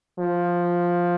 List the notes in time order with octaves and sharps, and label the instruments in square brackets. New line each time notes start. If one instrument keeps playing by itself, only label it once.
[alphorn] F3